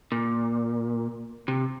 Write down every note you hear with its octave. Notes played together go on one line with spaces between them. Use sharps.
A#2
C3